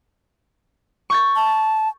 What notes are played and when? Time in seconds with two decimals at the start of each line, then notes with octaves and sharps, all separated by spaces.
1.10 C#6 G6 A6
1.36 A5